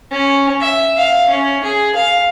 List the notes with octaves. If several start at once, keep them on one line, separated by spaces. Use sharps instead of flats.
C#4
E5
F5
C#4
G#4
F5